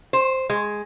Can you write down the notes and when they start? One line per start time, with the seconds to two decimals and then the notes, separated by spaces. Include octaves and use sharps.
0.13 C5
0.49 G#3